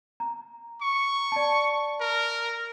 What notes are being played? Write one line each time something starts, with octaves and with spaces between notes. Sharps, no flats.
A#5
C#6
D5 A5
A#4